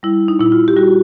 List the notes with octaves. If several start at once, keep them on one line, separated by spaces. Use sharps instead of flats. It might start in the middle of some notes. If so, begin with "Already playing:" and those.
G3 E4
D#4
A#2 E4
F4
G4
G3 F#4